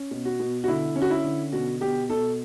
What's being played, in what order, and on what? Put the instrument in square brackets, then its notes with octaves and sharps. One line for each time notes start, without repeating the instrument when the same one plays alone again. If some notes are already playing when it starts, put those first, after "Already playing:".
Already playing: [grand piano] C#4
B2
F#4
B2
F#4
D3 E4
C#4
F#4
E4
D3
B2 F#4
B2 G4
B2 A4